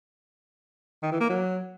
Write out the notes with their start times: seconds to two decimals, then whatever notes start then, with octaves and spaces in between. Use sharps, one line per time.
1.03 D#3
1.12 E3
1.21 A#3
1.30 F#3